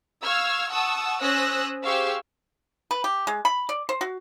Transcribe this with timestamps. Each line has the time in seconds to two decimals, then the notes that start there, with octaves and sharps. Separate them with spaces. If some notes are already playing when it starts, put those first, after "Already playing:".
0.22 F5 C#6 E6 F6 G#6
0.69 F#5 A5 C#6 D#6 E6
1.21 C#4 C5 D#6 E6 F#6 A#6
1.84 G4 G#4 C5 F5 C#6 E6
2.91 B4
3.04 G4
3.27 G#3
3.45 B5
3.69 D5
3.89 C5
4.01 F#4